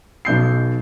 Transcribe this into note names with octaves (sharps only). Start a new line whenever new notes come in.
B1 B2 G6 C7